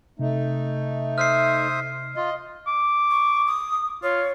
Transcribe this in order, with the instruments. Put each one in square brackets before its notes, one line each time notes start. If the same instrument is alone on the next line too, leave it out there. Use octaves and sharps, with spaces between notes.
[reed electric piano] C3 [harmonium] A3 D#4
[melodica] C5 E5 D#6 [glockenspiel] F6 C7
[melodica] F4 [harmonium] D#5
[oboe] D6
[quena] C#6
D#6
[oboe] F4 [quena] C#5